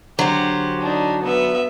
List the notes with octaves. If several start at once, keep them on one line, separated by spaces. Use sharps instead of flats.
D3 F#3 G4 C5
D4 D#4
B3 E5